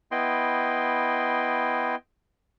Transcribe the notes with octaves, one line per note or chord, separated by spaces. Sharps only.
B3 E4 D#5 G5 C6